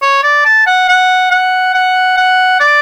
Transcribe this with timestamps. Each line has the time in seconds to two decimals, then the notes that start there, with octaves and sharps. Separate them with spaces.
0.02 C#5
0.23 D5
0.45 A5
0.67 F#5
0.89 F#5
1.31 F#5
1.75 F#5
2.17 F#5
2.60 D5